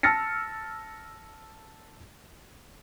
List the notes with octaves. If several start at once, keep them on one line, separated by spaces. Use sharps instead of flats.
A5 E6 F6 A6 A#6 C#7